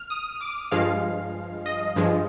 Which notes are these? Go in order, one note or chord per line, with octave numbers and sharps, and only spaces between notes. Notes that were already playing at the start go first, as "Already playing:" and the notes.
Already playing: F6
D#6
D6
G2 F3 G#3 F5
D#5
G2 F3 G#3